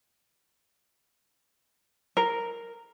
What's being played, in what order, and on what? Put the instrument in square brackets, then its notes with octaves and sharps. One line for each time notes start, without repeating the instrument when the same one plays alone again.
[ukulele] A#4